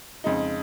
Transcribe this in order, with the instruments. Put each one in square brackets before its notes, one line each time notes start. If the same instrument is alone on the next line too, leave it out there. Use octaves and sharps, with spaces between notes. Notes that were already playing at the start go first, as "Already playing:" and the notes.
[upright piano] F2 C#3 G#3 D#4